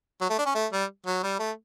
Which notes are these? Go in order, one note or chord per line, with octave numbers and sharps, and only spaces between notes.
F#3
A3
D4
C#4
A3
G3
F#3
G3
A3